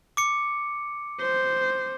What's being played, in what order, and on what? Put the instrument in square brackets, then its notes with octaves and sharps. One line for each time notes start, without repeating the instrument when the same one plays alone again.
[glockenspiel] D6 C#7
[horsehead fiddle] C5